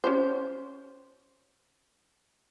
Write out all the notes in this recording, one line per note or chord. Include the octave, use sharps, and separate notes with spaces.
C#4 G4 C5